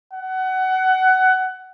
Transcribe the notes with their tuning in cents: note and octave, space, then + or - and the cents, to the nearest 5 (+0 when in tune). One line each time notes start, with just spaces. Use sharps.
F#5 +20